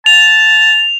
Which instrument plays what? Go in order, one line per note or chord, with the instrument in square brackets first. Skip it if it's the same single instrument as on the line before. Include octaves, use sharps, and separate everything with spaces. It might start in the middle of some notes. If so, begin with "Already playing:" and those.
[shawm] A5 [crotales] F7